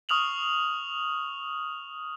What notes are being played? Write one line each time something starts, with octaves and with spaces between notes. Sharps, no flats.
C#6 D#6 F6 F7 F#7